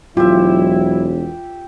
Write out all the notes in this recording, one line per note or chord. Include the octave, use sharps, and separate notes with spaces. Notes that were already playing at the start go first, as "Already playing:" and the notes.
E1 F#3 E4 F4 G4 E5